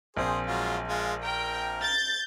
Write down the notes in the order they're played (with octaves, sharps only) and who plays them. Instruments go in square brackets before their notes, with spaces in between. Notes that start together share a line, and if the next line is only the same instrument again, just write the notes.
[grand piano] A#1 C4 [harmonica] G#4 C5
[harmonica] F#3 G#3 F4
G#3 F4
[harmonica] A#4 [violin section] G5
[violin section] G6 A6